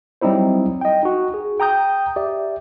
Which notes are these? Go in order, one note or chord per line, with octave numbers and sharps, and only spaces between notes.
F#3 G3 C4 D#4 E4 C5
D#5 G5
D#4 F#4
G#4
G5 A#5 D#6 G6
G4 D5 E5